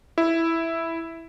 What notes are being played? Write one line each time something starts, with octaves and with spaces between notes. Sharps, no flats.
E4